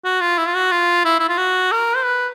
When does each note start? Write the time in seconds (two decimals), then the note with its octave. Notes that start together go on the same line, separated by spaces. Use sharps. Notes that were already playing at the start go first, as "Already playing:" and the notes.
0.04 F#4
0.21 F4
0.38 E4
0.47 F4
0.55 F#4
0.71 F4
1.05 E4
1.19 E4
1.29 F4
1.38 F#4
1.72 A#4
1.96 C5
2.04 B4